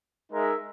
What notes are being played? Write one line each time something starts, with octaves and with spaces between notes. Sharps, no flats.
G#3 D#4 A#4 E5